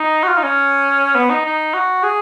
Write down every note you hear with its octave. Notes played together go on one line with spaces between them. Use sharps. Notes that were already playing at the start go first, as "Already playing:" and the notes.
Already playing: D#4
F#4
F4
D#4
C#4
B3
D#4
D#4
F#4
G#4